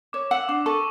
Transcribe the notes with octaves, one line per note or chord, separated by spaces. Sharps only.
C#5 D6
F#5 E6
E6
D4 D6
A4 C#6